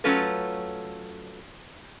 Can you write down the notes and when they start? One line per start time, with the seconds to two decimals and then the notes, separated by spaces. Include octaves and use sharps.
0.04 F#3 A3 C#4 F4 A4 B4